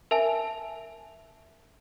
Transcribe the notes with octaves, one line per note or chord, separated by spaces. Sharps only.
A#4 E5 G#5 A5